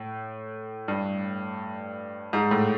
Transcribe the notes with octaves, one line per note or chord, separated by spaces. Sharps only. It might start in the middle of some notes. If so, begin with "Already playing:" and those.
Already playing: A2
G2
G#2
A2